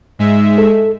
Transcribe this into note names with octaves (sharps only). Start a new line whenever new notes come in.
G#2 G#3 E5
A4